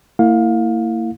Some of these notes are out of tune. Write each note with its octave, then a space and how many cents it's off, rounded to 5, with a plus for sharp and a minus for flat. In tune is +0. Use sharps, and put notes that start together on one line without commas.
A#3 -40 E4 +0 F5 +25